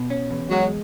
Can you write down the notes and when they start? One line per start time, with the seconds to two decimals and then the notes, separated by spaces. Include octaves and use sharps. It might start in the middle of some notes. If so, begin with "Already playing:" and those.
Already playing: B2
0.10 C#4
0.31 E2
0.51 F#3 G#3